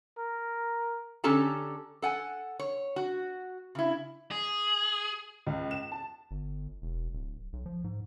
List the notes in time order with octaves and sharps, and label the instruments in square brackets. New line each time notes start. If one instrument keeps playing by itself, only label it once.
[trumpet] A#4
[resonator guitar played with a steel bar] D3 C#4 G4 A4 A5 A#5
A4 F#5 G#5
C#5
F#4
C#3 E4
[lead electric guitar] G#4
[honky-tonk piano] C#2
E7
A5
[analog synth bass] G1
E1
D1
B1
F3
G#2